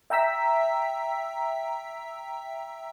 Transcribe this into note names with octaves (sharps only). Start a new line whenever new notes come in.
E5 G5 A#5 E6 B6